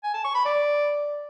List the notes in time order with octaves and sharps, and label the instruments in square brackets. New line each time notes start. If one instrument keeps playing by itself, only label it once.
[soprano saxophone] G#5
A5
C#6
B5
D5